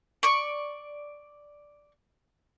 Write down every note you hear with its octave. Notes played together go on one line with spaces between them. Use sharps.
D5 C#6